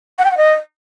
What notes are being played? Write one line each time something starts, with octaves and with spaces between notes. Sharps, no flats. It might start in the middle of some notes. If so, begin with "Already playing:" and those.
F#5
G5
F#5
D#5